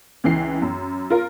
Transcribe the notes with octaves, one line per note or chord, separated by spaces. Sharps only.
C#2 E3 C7
F#2
F4 A#4